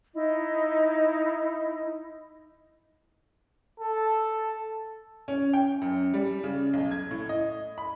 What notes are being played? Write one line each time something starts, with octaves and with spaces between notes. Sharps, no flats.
D#4 E4 D#5
A4
C#4
G5
F#2
G3
C#3
B1
G#6
A2
D#5
B5